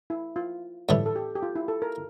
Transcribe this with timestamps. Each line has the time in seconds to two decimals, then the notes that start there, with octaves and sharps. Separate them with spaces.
0.10 E4
0.36 F4
0.89 A2 E3 G3 A4
1.06 A4
1.16 G4
1.36 G4
1.43 F4
1.56 E4
1.68 A4
1.82 A#4